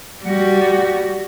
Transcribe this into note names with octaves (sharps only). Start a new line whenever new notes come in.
G3 F#4